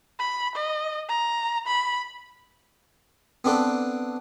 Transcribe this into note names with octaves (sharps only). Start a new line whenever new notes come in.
B5
D#5
A#5
B5
B3 C4 D4 A4 B4